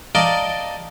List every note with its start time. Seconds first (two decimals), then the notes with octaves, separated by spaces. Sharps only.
0.15 A#4 D5 D#5 F5 G5 A5